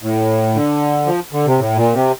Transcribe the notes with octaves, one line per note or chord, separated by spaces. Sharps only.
A2
D3
F3
D3
C3
A2
A#2
C3